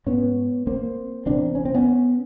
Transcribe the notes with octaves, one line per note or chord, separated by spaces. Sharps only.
G#2 B3 C#4
A#3 C4
E2 C3 C4 D4
C#4
C4
B3 C#4